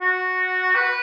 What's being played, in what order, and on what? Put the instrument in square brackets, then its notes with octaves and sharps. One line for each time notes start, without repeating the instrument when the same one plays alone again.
[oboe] F#4
B4